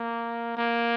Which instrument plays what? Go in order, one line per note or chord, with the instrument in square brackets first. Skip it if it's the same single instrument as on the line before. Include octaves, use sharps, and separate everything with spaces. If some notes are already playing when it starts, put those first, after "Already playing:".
Already playing: [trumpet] A#3
A#3